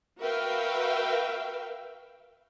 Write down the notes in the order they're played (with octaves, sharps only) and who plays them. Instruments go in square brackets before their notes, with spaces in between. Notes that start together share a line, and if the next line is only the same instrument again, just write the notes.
[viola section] F#4 A#4 B4 E5 F5 G5